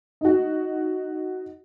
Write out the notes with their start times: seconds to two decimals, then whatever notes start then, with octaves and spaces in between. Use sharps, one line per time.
0.21 D#4 F#4